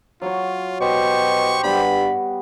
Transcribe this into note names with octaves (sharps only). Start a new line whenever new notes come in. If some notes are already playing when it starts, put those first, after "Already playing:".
F#3 F4 C#5
B2 G4 C5 C#6
G2 G3 B3 B5